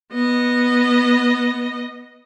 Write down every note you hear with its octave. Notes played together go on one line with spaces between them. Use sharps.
B3 D#5